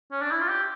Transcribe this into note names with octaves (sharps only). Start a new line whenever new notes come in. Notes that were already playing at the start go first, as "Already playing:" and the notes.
C#4
D4
E4
F4
G4